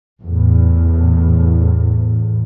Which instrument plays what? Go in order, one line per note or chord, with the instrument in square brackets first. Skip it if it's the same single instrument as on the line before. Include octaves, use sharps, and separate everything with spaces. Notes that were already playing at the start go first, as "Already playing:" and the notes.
[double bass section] E2 A2